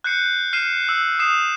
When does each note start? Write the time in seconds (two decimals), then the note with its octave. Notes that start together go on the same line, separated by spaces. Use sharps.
0.04 F#6 G6 C7 C#7
0.53 F6 C7 D#7 E7
0.89 E6
1.19 D#6 C7 E7